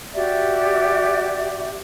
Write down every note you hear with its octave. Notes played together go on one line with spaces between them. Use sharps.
F#4 G4 D5 E5